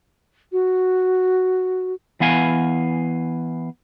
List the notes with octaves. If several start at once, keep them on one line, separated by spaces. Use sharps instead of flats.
F#4
E3 B3 F5 G#5